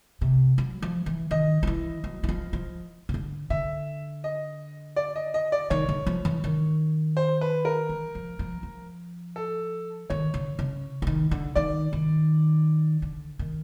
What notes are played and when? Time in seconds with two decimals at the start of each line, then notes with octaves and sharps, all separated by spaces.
0.21 C3
0.58 F#3
0.82 F3
1.06 E3
1.31 D#3 D#5
1.63 F3
1.67 E3
2.04 F#3
2.23 E3
2.29 F3
2.53 F3
3.09 C#3
3.14 D3
3.50 D3 E5
4.24 D#5
4.96 D5
5.16 D#5
5.34 D#5
5.52 D5
5.70 D#3 C#5
5.89 D3
6.07 F3
6.25 E3
6.44 D#3
7.17 C5
7.41 B4
7.65 A#4
7.89 E3
8.15 F3
8.39 F3
8.63 F3
9.36 A4
10.10 D#3 C#5
10.34 D3
10.59 C#3
11.02 D3
11.07 D#3
11.31 D3
11.55 D#3 D5
11.93 D#3
13.02 D3
13.39 D#3